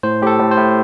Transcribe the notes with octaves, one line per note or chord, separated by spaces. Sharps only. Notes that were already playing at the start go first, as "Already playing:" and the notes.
A2 C5
A2 G4
A4
A2
C5
A2